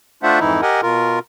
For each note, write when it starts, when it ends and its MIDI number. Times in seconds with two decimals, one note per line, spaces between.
0.23 0.39 57
0.23 0.39 62
0.23 0.39 65
0.23 0.39 72
0.23 0.39 76
0.23 0.39 78
0.40 0.61 41
0.40 0.61 44
0.40 0.61 52
0.40 0.61 63
0.40 0.61 64
0.62 0.81 67
0.62 0.81 70
0.62 0.81 75
0.62 0.81 78
0.62 0.81 80
0.82 1.19 47
0.82 1.19 65
0.82 1.19 70